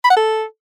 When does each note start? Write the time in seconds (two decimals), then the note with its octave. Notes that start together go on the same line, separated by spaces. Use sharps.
0.04 B5
0.10 F#5
0.17 A4